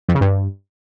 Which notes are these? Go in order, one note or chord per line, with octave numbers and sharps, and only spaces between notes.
F2
C#3
G2